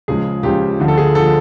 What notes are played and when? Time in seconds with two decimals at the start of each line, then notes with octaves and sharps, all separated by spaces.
0.08 C#2 C#3 F3 G#3 G#4
0.43 C#2 C#3 F3 G#3 G4
0.80 D2 D3 F3
0.88 A4
0.97 G#4
1.15 D3 F3 A4